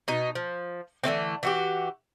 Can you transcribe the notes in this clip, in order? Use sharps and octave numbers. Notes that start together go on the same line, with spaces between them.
B2 D#4
F3
D3 E3 A3 C4
E3 F#4 G4